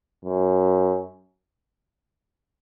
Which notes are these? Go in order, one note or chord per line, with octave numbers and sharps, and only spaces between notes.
F#2